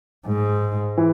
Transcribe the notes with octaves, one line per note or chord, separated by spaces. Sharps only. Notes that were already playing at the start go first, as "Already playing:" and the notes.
G#2
E3